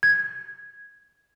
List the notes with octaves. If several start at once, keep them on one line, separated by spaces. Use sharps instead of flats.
G#6